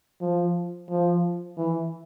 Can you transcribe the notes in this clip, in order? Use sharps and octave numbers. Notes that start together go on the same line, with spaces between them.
F3
F3
E3